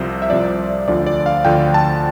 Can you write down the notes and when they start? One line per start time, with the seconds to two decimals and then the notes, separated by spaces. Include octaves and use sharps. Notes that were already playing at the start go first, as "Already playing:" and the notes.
Already playing: C2 C3 F3 C5
0.22 E5
0.30 C2 C3 F3 D5
0.88 D2 D3 F3 D5
1.07 D5
1.26 F5
1.45 D2 D3 F3 G5
1.74 A5